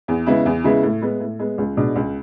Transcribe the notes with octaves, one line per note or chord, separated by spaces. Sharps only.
E2
C#3 G#3 B3 E4
E2
C#3 G#3 B3 E4
A2
G#3 B3
A2
G#3 B3
C#2
B2 G#3 D4
C#2